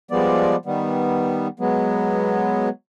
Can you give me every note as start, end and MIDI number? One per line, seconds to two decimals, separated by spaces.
0.11 0.56 53
0.11 0.56 55
0.11 0.56 56
0.11 0.56 59
0.11 0.56 74
0.66 1.48 51
0.66 1.48 55
0.66 1.48 59
1.60 2.69 54
1.60 2.69 56
1.60 2.69 59